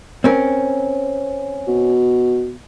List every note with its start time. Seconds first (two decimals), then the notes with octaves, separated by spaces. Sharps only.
0.24 C4 C#4 A#4
1.68 B2